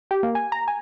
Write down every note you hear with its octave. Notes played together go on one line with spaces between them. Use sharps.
G4
A#3
G#5
A#5
G#5